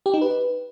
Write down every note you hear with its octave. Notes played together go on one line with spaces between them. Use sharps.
G4
D#4
B4